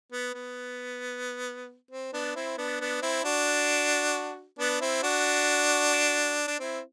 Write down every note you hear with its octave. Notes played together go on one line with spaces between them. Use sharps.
B3
B3
C4
B3 D4
C4 E4
B3 D4
B3 D4
C4 E4
D4 F#4
B3 D4
C4 E4
D4 F#4
D4
C4 E4